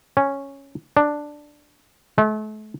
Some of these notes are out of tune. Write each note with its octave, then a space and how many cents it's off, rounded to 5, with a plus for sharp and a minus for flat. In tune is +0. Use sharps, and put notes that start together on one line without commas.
C#4 -5
D4 +5
A3 -40